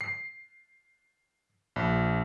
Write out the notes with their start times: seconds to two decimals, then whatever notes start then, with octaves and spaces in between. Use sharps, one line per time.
0.01 C7
1.76 A#1